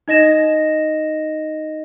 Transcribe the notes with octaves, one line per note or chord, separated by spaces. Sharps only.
D#4 D#5 A#6 E7